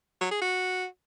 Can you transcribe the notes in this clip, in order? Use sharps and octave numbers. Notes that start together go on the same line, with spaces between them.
F#3
G#4
F#4